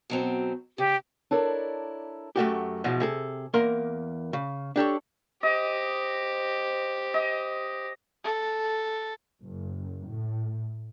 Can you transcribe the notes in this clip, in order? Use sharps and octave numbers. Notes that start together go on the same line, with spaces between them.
B2 F#3 C4
C#3 G4
D4 E4 A4 A#4 C#5 D5
F#2 A3 F#4 G4
G#2 B2 E3 F3
C3 G#4 A4
E2 A#3 A#4 C6
C#3
D4 G4 A4 C#5
G4 C5 D#5
D#5
A4
F#1
A2